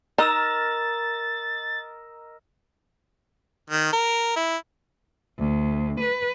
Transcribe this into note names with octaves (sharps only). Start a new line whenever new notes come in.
D#4 A#4 D#5 A#5 E6 A6 E7
D#3
A#4
E4
D2
B4